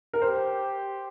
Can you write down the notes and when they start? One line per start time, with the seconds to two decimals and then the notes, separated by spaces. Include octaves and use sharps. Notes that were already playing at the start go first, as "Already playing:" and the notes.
0.13 A#4
0.22 G4 C5